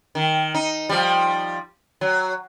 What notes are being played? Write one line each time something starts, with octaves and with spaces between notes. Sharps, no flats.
D#3
D#4
F3 G3
F#3